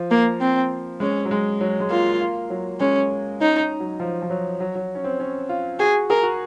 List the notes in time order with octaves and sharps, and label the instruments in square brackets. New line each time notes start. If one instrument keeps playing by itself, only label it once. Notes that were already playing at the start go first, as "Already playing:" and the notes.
Already playing: [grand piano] F3
[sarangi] A#3
C4
[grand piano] G#3 [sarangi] C#4
[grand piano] F#3
G#3
F#3
G#3
[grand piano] A#3 [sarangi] F4
[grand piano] A#3
F#3
[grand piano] G#3 [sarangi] C#4
[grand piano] C#4 [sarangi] D#4
[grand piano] D#4
F#3
F3
F3
F#3
F#3
F#3
C#4
C4
C#4
F4
[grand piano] F#4 [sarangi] G#4
[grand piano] G#4 [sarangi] A#4
[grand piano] F#4